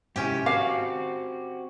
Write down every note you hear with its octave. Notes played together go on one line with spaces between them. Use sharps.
G#2 C3 C#4 E4 G4
C4 F#4 F5 D6